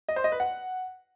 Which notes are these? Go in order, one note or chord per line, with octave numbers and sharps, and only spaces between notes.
D#5
C5
D#5
B4
F#5